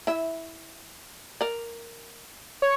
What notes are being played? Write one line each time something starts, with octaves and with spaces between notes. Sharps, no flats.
E4 E5
A#4 D5
C#5